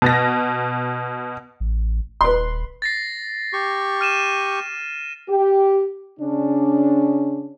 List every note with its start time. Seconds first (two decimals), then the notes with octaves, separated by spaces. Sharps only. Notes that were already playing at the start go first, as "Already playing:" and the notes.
0.02 B2 A6 A#6
1.60 A1
2.21 D#1 B4 C6
2.82 A6 A#6 C7
3.53 G4 C#6
4.01 F6 D#7 E7
5.29 G4
6.19 C#3 C#4 D4